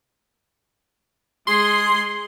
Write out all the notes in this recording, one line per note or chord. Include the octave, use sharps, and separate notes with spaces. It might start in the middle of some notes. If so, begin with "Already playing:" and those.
G#3 G#4 C6